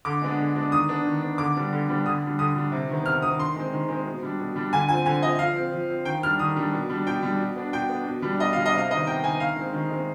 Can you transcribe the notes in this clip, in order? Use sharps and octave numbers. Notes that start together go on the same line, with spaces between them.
D3 D6
G#3 B3 D4
D3
G#3 B3 D4
D#3 D#6
B3 D4
D#3
B3 D4
D3 D6
G3 B3 D4
D3
G3 B3 D4
D3 D#6
G3 D4
D3 D#6
G3 D4
C3
D#3 B3
C3 F6
D#3 B3 D#6
D#3 C6
G#3 C4
D#3
G#3 C4
B2
G3 D4
B2
G3 D4
D3 G#5
F3 C4 G#5
D3 G#5
F3 C4 D#5
F3 F5
C4
F3
C4
D#3 G5
G3 D4 F6
D#3 D#6
G3 D4
B2
G3 D4
B2 G5
G3 D4
B2
B3 D4
B2 G5
B3 D4
B2
G3 D4
B2 D#5
G3 D4 F5
D#5
C3 F5
D#3 B3 D#5
C3 G5
D#3 B3 G#5
D#3 F5
G#3 C4
D#3
G#3 C4